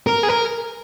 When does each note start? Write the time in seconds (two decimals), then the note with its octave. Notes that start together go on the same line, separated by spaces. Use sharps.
0.07 A#4
0.23 G#4
0.29 A#4